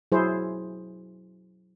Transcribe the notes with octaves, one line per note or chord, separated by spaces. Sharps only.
F#3 E4 G#4 C5